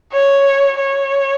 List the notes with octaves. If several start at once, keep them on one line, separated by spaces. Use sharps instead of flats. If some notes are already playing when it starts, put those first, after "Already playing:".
C#5
C#5